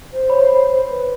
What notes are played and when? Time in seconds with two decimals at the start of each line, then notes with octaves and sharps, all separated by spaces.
0.13 C5
0.29 C#5 B5
0.90 B4